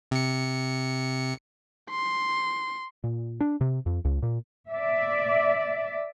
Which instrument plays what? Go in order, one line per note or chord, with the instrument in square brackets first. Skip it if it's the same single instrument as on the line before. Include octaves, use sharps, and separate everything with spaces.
[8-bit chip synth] C3 C#7
[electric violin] C6
[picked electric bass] A#2
D4
C3
F2
C#2
A#2
[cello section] D5 E5